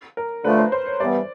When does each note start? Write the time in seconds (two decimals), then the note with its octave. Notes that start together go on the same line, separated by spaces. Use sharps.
0.17 A#4
0.44 D3 F3 A3 B4
0.58 C5
0.72 C5
0.86 C#5
0.99 G2 E3 G3 B3 D5